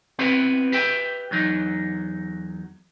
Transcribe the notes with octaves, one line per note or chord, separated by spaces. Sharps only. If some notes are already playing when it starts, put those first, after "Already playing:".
B3 C4 E4 G4 B4
G4 B4 E5 G5
E2 F#3 D#4